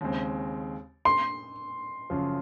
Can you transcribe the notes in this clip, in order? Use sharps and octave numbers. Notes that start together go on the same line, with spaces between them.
D#2 C#3 G#3 C4
C6
F#1 F#2 F3